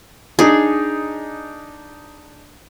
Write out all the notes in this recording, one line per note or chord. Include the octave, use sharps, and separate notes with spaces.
D4 D#4 G#4